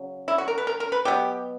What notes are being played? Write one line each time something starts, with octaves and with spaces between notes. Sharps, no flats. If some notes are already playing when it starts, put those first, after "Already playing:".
Already playing: C#3 F#3
E4
F#4
A#4
B4
A#4
A#4
B4
B2 F#3 B3 G4